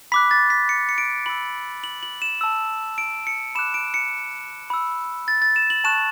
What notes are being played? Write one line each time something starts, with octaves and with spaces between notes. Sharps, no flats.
B5 D6 F#6 B6
A6
B6
C#7
C#7
D7
B5 E6 F#7
F#7
F#7
E7
A5 E6
D7
C#7
B5 D6 F#6 E7
D7
C#7
B5 E6
A6
A6
E7
F#7
A5 C#6 F#6 E7